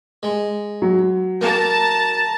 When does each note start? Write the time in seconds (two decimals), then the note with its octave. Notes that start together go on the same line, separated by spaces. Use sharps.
0.23 G#3
0.82 F#3
1.41 A#3 A5 A#5